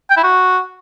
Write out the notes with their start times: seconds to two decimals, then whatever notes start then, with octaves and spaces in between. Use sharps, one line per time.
0.10 G5
0.17 E4
0.24 F#4